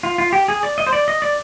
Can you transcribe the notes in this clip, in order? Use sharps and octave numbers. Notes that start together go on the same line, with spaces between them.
F4
F4
G4
G#4
D5
D#5
C5
D5
D#5
D5